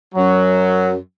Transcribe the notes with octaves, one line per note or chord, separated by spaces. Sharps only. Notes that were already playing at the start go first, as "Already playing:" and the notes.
F#2 F#3